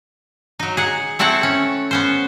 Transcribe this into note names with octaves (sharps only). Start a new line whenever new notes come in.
F#3 D#4
G#4 F#5
A3 C4 E4 A4 F#5
C#4
B3 C#4 C5